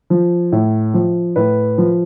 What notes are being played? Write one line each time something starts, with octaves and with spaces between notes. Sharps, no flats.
F3
A2
F3
A2 B4
F3